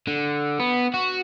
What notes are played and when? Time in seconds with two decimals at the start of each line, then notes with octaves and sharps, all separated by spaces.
0.07 D3
0.60 B3
0.94 F#4